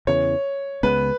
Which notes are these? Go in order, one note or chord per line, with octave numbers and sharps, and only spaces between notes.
E2 C#3 E3 C#5
C#2 C#3 G#3 B3 B4